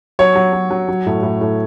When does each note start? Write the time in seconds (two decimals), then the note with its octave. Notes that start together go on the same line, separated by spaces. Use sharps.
0.19 F#3 C#5
0.36 F#3
0.53 F#3
0.70 F#3
0.88 F#3
1.06 A2
1.23 A2
1.41 A2